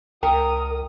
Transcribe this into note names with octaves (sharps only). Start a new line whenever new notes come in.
C#2 A#4 G5 D#6